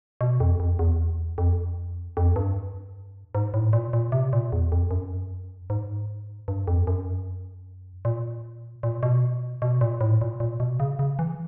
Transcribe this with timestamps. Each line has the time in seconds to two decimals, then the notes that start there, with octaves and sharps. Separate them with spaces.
0.21 B2
0.40 F2
0.60 F2
0.79 E2
1.38 F2
2.17 F2
2.36 G2
3.35 G#2
3.54 A2
3.73 A#2
3.93 A#2
4.12 C3
4.33 A#2
4.52 E2
4.72 F2
4.91 F#2
5.70 G#2
6.48 G2
6.68 F2
6.87 F#2
8.05 A#2
8.83 A#2
9.03 B2
9.62 B2
9.81 A#2
10.01 A2
10.21 A#2
10.40 A#2
10.60 B2
10.80 C#3
10.99 C#3
11.19 E3